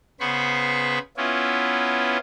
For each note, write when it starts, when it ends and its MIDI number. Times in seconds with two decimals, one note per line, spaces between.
0.20 0.99 49
0.20 0.99 59
0.20 0.99 72
0.20 0.99 83
0.20 0.99 85
1.17 2.18 59
1.17 2.18 61
1.17 2.18 64
1.17 2.18 65